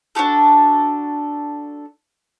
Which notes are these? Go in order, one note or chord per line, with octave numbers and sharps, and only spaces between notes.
D4 F#4 G4 A4